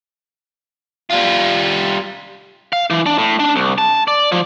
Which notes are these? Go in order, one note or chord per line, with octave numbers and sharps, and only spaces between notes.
G3 F4
F5
E3
D4
A2
D4
C2
A5
D5
F3